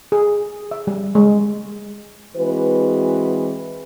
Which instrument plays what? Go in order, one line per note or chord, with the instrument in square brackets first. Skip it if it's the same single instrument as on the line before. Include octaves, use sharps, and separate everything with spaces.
[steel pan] G#4
E5
G3
G#3
[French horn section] E3 G#3 C4 F#4 B4